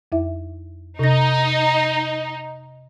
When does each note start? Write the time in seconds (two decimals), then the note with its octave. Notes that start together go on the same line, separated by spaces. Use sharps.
0.12 F2 E4 E5
0.99 C3 D#4 A#6